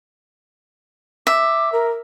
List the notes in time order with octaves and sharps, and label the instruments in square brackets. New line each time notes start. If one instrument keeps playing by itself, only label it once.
[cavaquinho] E5 [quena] D6
[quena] A#4